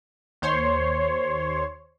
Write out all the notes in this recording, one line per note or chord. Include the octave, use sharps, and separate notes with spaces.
D#2 C5 C#5 C6